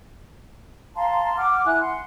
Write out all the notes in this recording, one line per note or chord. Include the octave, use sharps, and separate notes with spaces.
F5 A5 A#5 C6
F#5 D6 F6
E4 G#5 F#6
F#5 C6